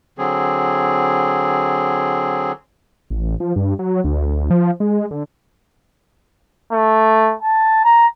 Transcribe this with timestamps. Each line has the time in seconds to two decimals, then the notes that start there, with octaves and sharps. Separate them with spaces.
0.18 D3 F#3 C4 G#4
3.10 A1
3.40 F3
3.56 G2
3.79 F#3
4.04 D2
4.26 D2
4.50 F3
4.80 G#3
5.11 D3
6.73 A3
7.43 A5
7.84 A#5